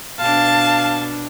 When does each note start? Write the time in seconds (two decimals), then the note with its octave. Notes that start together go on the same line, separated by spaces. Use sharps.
0.20 B2 D4 F5 A5